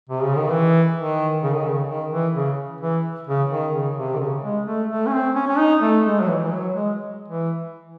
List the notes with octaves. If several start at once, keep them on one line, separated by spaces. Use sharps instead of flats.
C3
C#3
D#3
E3
D#3
C#3
D#3
C#3
D#3
E3
C#3
E3
C#3
D#3
C#3
C3
D#3
C#3
G#3
A3
A3
C#4
C4
C#4
C#4
D#4
A3
G#3
F#3
E3
E3
F#3
G#3
E3